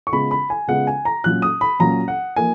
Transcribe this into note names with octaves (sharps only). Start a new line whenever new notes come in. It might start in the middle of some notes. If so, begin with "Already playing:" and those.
C#6
C#3 G#3 B3 F4 B5
B5
G#5
C#3 G#3 B3 F4 F#5
G#5
A#5
A#2 F#3 C#4 F4 F#6
D#6
B5
A#2 F#3 C#4 F4 A#5
F#5
F3 A#3 D#4 G#5